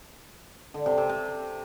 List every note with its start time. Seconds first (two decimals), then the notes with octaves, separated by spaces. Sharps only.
0.74 D3
0.86 C3
0.98 C3
1.09 C3